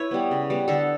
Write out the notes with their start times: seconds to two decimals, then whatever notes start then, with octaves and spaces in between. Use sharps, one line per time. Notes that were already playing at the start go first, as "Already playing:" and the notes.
Already playing: E4 B4 C#5
0.11 G3 B3
0.31 C#3
0.50 G3 B3
0.68 D3 A4